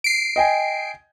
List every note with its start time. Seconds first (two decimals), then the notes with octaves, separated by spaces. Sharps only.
0.04 C7 D7
0.36 D#5 G5 G#5